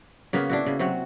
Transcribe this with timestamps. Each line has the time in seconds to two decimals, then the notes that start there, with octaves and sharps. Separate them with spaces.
0.33 C#3 A#3 B3 C#4
0.50 D4 E4 F#4
0.66 C#3
0.79 C3 F#3 F#4